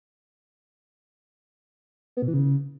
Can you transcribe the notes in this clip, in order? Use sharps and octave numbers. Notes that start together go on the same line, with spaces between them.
B3
B2
E3
C#3